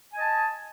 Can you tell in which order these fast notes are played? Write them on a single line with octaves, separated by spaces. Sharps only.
G#5 D#5 A5